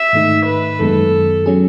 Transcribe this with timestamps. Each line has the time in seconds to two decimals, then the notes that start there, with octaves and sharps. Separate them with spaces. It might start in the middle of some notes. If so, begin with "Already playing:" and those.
Already playing: E5
0.13 G#2 D#3 A3 D#4
0.46 B4
0.79 F#2 D#3 G#3 B3 A4
1.46 F#3 C#4 G#4